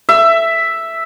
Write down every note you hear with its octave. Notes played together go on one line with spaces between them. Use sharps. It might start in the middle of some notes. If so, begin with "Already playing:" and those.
E5